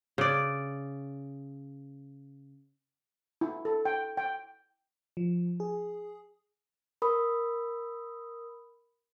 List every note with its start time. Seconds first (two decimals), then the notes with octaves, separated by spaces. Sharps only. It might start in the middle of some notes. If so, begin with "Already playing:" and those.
0.18 C#3 D5
3.41 E4
3.65 A4
3.85 G5
4.17 G5
5.17 F3
5.60 G#4
7.02 A#4 B5 D#6